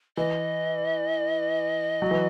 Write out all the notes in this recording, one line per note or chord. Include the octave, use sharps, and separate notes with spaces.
E3 D#5
F#3
E3